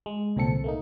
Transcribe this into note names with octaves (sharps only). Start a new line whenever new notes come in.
G#3
C2 A#2 D3 C4 A4 C#7
A3 A#3 D#4